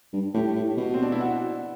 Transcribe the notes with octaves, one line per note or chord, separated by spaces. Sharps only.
G2
A2 G4
A2
B2
C4
D4
E4
F#4